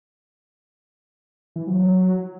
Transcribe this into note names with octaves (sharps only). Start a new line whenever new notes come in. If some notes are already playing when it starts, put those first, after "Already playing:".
E3
F#3
F#3